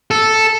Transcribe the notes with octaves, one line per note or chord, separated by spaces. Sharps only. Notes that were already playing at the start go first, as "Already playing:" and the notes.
A4